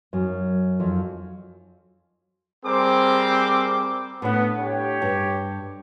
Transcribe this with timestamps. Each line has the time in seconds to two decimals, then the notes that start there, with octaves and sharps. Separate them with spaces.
0.13 F#2
0.80 F2
2.65 G3 C4 G#4 A#4 C5 D6
4.22 A2 B3 D4
4.58 G4 C#5
5.02 G2